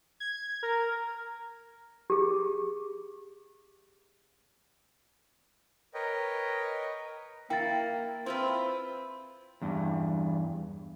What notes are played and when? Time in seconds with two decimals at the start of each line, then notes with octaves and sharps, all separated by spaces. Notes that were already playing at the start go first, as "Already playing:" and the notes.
0.20 G#6
0.63 A#4
2.10 G4 G#4
5.94 A#4 B4 C#5 D#5 G5
7.50 A#3 E4 G5 A6
8.26 C4 E4 F4 B4
9.62 E2 G2